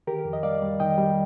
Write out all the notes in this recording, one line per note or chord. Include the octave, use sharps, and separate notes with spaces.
D#3 G4 A#4
F2
D#5
G3 D5 F5
G3
D#3 D#5 G5
G3